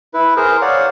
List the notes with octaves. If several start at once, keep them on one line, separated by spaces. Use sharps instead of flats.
E4 B4
G#4 A#4 C5
C#5 D5 F5 F#5